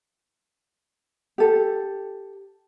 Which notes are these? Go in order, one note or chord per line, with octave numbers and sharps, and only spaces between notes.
G4 A4